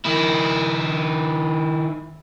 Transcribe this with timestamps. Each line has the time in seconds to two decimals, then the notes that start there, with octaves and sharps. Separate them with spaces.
0.05 D#3 E4